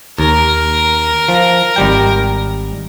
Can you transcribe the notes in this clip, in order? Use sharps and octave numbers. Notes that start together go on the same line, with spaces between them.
D#2 A#4
F3
G#1 G3 G5